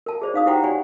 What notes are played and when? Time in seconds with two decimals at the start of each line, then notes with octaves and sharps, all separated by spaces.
0.06 A#4 A5
0.22 G#4 C5 D5
0.34 D#4 F5 D#6
0.46 E4 G4 C5 F#5 G5 A#5
0.64 G4 C#5 D5 F#5 G#5